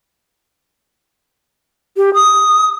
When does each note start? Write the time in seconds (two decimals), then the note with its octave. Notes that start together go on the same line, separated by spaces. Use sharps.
1.97 G4
2.14 D#6